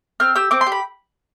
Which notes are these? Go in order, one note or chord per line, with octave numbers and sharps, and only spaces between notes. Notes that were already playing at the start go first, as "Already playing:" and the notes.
C4 F6
G4 E6
C4 D6
C6
G4
B5